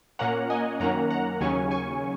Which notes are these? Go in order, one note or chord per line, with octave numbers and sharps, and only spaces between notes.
A#2 A#3 C#4 F#5 A#5
D#5 G#5
F#2 D#3 A#3 C#4 F#5 A#5
F#5 A#5
D#2 C#3 F#3 C#4 G#5 C#6
G#5 C#6